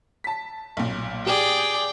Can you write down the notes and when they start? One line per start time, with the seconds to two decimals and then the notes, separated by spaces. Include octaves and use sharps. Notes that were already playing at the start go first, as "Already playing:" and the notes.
0.24 A5 B6
0.77 B1 A#2
1.26 G4 G#4 D5 G5